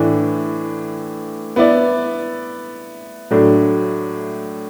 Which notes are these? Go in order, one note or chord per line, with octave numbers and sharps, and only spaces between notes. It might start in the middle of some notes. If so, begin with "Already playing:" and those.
Already playing: A2 E3 D4
B3 E4 D5
A2 F#3 A3 D4